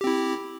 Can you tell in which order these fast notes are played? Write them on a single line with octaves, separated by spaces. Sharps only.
G4 C4 E4